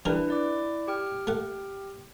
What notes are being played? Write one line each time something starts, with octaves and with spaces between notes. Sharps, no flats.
E3 G3 D4 E4 A#4 B4
E4 D5 D6
G4 G5 F6
A3 F#5